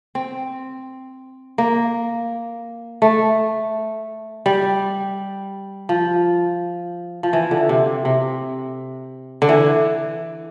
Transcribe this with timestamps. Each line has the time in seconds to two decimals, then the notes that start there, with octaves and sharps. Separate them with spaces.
0.15 C4
1.58 A#3
3.02 A3
4.46 G3
5.89 F3
7.23 F3
7.33 E3
7.51 D3
7.69 C3
8.05 C3
9.42 D3
9.49 E3